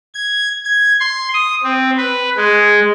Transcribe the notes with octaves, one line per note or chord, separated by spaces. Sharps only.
G#6
G#6
C6
D#6
C4
B4
G#3